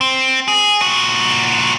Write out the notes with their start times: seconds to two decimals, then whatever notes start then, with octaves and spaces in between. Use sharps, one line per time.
0.01 C4
0.48 G#4
0.82 A#2 F#4